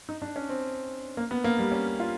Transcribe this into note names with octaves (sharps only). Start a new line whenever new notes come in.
D#4
D4
C#4
C4
A#3
B3
A#3
G3
C#4
F4